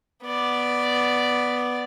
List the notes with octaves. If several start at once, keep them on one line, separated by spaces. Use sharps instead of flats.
B3 D5